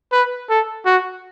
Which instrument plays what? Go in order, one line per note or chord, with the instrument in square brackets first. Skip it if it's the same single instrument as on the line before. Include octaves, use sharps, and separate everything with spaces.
[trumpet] B4
A4
F#4